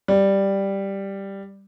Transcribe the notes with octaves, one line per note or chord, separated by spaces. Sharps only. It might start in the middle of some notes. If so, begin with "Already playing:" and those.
G3